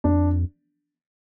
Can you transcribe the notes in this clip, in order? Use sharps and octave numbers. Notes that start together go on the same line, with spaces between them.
F2 D4